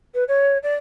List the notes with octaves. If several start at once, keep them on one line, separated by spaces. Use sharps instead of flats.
B4
C#5
D5